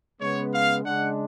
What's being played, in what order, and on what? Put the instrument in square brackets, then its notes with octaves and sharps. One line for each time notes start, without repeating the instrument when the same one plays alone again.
[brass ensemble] C#3 G#3 B3 C#5
F5
C#3 G#3 D4 F#5